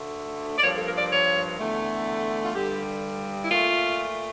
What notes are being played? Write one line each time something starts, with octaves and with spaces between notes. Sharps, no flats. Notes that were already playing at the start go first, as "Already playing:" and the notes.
Already playing: D2 D3 A3
D5
G2 F3 A#3 C#5
A4
A#4
D5
C#5
E2 D3 A3
F4
G2 D3 G3 G4
E4
A#2 A3 F4